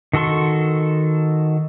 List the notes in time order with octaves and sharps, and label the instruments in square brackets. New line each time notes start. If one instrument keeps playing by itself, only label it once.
[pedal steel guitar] D#3 F#4 A4 C6 C#6